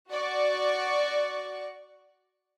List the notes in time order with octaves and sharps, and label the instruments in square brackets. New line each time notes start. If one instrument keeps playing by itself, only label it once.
[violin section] F#4 D5 C#6